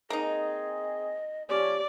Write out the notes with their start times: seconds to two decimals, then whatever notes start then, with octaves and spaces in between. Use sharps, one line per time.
0.10 A#3 C4 D#4 G#4 D#5
1.49 F3 C#4 G4 D5